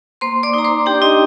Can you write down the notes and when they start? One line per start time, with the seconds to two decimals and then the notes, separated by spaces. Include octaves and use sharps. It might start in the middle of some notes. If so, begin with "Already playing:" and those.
0.21 A#3 C5 C6
0.43 D5 D6
0.54 D#4 A#5
0.64 C5 C6
0.86 D4 G4 G5
1.02 D#4 D#5